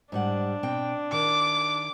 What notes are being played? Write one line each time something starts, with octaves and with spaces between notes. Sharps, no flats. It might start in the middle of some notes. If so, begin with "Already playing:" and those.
G#2 G3 D4 F#5
B2 C4 G5
D#3 D6